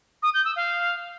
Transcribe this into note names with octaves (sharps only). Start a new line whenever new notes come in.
D#6
G6
E6
F5